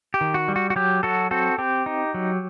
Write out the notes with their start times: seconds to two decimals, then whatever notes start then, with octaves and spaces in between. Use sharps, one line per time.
0.14 G4
0.21 D#3
0.34 F#4
0.48 G3
0.56 F#4
0.70 F#4
0.76 F#3 G4
1.03 F#3 F#4 A4
1.31 C4 F#4 A4
1.58 C4 G4
1.86 D#4
2.14 F#3